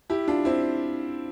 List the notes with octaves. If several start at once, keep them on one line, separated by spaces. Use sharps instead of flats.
E4 G4
D4 F4
C4 E4